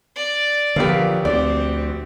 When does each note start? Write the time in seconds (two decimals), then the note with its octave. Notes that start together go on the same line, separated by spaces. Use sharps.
0.16 D5
0.76 A#1 D3 F3 B3 G4 A#4 F5
1.25 D2 C4 D5